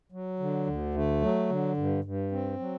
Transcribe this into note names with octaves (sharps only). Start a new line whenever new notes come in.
F#3
D3
D2
A3
F#3
D3
G2
G2
C4
F#3